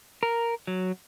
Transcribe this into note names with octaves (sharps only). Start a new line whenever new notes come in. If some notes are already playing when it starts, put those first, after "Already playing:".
A#4
F#3